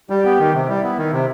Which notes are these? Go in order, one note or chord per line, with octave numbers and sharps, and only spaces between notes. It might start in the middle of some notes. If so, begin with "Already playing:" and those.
G3 G4
B3
D#3
C3
G3 E4
B3
D#3
C3